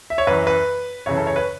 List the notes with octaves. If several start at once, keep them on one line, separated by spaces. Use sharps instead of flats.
E5
C#5
F#2 E3 B4
B4
F#2 C#3 E3 C#5
A4
C#5
B4